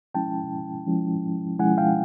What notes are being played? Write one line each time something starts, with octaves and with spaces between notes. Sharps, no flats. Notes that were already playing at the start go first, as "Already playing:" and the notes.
F3 G#3 C#4 E4 G5 A5
F3 G#3 C#4 E4
F3 G#3 C#4 E4 F#5 G#5
F5 G5